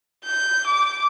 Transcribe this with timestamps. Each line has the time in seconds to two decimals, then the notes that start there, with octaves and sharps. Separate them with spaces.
0.25 G6
0.66 D6